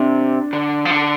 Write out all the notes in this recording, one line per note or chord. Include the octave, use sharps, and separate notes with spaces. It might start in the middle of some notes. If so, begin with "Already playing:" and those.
Already playing: C3 D4
D3
F3
D3